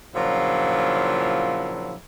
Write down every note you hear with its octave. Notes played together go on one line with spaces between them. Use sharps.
A#2 C#3 F3 F#3 D4 E4